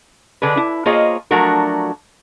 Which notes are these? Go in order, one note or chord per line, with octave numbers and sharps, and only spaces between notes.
D3 D4 G#4 B4
E4
A#3 F4 G#4 C5 C#5 D#5
F3 F#3 A3 D4 F#4 A#4